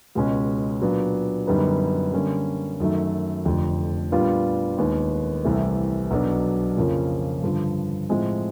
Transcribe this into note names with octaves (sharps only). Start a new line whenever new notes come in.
C#2 B2 G#3 C#4
A#2 F#3 B3 D4 F4
F#2 D3 G3 B3 D#4
D3 G3 A#3 C#4
F#2 D#3 F#3 A3
F1 F2 D3
A#2 G3 B3 D4 F4
D#2 D#3 G#3 B3
C2 C3 E3 A3
B1 B2 F#3 B3 D4
F2 C#3 F3 A#3 C#4
G2 D3 F3
A2 F3 G#3 C4